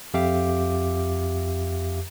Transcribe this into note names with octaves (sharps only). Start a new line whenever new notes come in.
F2 G4 E5 F5 D6